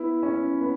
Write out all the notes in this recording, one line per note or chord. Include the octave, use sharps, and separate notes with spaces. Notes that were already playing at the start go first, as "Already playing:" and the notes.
Already playing: B3 E4
C#4
B3